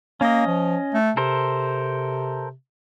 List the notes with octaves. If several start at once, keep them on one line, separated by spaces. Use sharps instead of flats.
A#3 C#4 D#5
F3
A3
C3 A4 A#4 C5